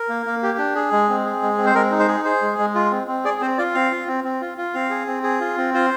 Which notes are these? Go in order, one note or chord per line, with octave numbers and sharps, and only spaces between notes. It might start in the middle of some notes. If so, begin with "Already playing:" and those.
Already playing: A#4
A#3
A#3
G4
D4
G#4
G#3
C4
G#4
G#3
C4
C5
G#3 A#4
D#4
C5
G#4
G#4 C5
G#3
G#3
F4
C4
C4
G#4 D5
C4 C5
F4 D5
C4 F5
F4
C4
C4
F4
F4
C4 F5
G#4
C4
G#4
F4
C4
F4 C5